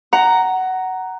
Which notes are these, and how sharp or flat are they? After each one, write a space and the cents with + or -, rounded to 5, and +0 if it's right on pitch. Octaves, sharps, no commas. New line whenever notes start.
F#5 +15 A#5 +0